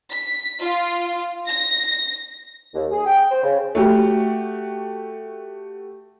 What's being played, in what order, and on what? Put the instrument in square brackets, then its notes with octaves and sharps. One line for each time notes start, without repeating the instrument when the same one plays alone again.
[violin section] B6
F4
A#6
[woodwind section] D#2
G#4
G5
C5
C#3
[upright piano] A3 F#4 G4